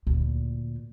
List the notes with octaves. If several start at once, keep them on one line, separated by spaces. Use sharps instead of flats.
D2 A#2